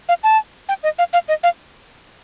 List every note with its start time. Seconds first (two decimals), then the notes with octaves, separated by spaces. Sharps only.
0.09 F5
0.23 A5
0.69 G5
0.83 D#5
0.99 F5
1.13 F5
1.28 D#5
1.43 F5